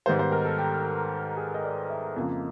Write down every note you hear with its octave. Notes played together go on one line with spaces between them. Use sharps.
G#2 D#3 G3 B3 C5
C5
A#4
A4
G4
G#4
D#5
D5
E5
F2 C#3 F3 A#3